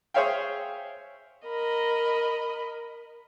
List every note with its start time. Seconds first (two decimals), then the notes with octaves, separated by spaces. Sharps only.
0.14 G#4 C5 C#5 E5 F5 G5
1.45 A#4 D#5 B5